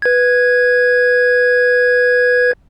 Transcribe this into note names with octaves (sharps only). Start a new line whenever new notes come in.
B4 G#6